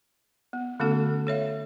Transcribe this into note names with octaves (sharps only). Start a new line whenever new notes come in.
B3
D3 A3 B3 C#4 F#4 A4
A4 C#5 E5 F5